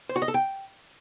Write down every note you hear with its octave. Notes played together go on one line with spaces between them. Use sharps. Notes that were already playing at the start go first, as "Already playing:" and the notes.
C5
F#4
D#5
A4
G5